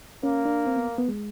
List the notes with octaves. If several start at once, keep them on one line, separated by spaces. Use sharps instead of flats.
A#3 C#4
D4
C4
B3
B3
G#3